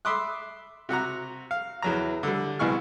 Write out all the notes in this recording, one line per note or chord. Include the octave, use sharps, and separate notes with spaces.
E5 B5 C6 D6 D#6 F#6
C3 F#4 F#5 A#5
F5
E2 F#3 A#5
D3 G3
C2 B2 E3 G#4 C#6 F6